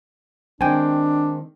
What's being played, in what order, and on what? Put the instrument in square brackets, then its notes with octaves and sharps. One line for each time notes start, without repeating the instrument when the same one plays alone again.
[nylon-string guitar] D#3 G#3 C4 [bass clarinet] D4 [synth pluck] G5 G#5